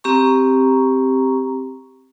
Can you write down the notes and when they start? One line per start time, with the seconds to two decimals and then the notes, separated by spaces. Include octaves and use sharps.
0.04 C4 G4 A#5 C#6